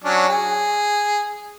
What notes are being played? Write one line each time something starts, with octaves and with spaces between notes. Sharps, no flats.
F#3 C#4 D4
G#4